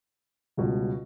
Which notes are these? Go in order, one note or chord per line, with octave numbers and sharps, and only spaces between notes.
C#2 B2 G3